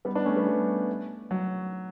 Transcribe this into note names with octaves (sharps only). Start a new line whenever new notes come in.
G3 B3
B3 D4
A3 C#4
G3 B3
G3
F#3